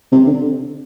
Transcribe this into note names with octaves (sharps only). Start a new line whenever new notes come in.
C3
D3